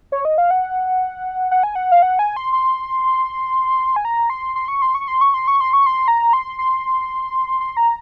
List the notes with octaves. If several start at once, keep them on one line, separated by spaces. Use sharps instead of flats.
C#5
D#5
F5
F#5
F#5
G#5
F#5
F5
F#5
G#5
C6
C6
G#5
A#5
C6
C6
C#6
C6
C#6
C6
C#6
C6
C#6
C6
C#6
C6
A#5
C6
C6
C6
A#5